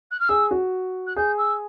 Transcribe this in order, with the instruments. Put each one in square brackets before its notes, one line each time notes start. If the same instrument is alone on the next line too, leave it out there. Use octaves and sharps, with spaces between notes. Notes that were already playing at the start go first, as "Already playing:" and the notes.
[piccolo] F#6
F6
[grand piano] G#4 [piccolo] E6
[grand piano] F#4
[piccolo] F#6
[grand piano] G#4 [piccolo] G6
[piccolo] E6